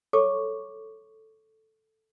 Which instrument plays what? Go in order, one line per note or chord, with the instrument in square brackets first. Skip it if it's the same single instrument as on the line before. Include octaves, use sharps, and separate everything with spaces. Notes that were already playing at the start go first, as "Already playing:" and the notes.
[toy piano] A4 C#6 D6 [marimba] C#5